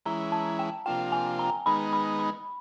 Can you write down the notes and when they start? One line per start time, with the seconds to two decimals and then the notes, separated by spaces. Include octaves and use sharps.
0.05 E3 G#3 C#4 E4 A#5
0.32 A5
0.59 G5
0.86 C3 F3 A#3 D4 F4 G5
1.12 G#5
1.39 A#5
1.66 D#3 G#3 B3 D#4 B5
1.93 B5
2.19 B5